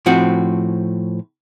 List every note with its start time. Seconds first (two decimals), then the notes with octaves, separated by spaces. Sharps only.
0.06 A2 F3 C4 F#4